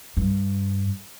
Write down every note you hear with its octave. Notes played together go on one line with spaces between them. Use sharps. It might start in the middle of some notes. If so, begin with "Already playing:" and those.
G2